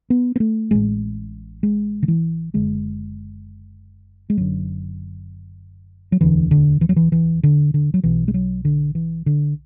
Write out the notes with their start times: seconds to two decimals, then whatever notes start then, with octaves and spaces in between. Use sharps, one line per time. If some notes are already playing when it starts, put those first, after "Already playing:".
0.10 B3
0.36 B3
0.40 A3
0.71 A1 A2 G#3
1.63 G#3
2.03 D3
2.08 E3
2.54 F#1 E2 D3 G#3
4.30 G#3
4.37 F#1 F#2 D3 F#3
6.12 F#3
6.21 E1 D2 D3 E3
6.51 D3
6.81 E3
6.89 F#3
6.96 E3
7.12 E3
7.43 D3
7.74 D3
7.94 F#3
8.04 B1 B2 E3
8.28 G#3
8.34 F#3
8.65 D3
8.95 E3
9.26 D3